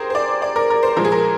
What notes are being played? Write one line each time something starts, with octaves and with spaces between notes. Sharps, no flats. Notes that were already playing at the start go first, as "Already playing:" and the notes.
Already playing: G4 G#4 A#4 C5
C5
D5
D5
A#4
A#4
C5
A#2 F3 G#3 A#4
G#4
A#4